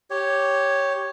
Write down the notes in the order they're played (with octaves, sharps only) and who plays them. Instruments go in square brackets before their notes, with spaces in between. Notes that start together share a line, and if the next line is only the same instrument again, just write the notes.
[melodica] G4 C#5